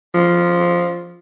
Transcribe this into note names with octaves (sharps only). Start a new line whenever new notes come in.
F3